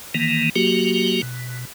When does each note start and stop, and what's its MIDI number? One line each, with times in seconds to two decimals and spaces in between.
0.14 0.49 51
0.14 0.49 52
0.14 0.49 58
0.56 1.21 54
0.56 1.21 58
0.56 1.21 66
0.56 1.21 67
1.22 1.65 47